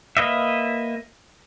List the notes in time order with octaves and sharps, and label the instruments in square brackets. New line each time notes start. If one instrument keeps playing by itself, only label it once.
[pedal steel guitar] A#3 B4 D#5 E5